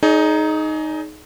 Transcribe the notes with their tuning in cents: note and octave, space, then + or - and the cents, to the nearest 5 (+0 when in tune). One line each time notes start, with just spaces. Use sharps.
D#4 +0 G#4 +30 D5 -40